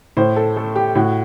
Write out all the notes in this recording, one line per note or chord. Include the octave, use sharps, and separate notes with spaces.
A2 C5
A4
A3 A4
G4
A2 F#4